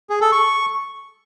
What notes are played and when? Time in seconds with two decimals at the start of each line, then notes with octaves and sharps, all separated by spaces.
0.10 G#4
0.21 A4
0.32 C#6